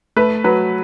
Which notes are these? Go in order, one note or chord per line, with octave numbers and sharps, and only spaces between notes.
A3 B4
F#3 B4